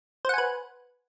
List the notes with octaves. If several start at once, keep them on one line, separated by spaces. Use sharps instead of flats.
B4 C5 F#5 G#5